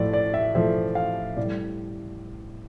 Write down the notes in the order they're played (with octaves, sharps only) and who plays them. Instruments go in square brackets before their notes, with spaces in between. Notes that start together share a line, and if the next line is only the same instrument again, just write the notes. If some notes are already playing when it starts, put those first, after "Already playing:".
Already playing: [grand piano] A2 F3 A3 D5
D5
E5
A2 F3 A3 E5
F5
A2 G3 D5